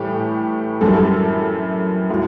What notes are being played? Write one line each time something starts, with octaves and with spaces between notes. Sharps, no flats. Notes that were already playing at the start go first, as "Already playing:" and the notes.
Already playing: A2 E3 G3 G4
F#2 E3 G3 A4
A2 F#3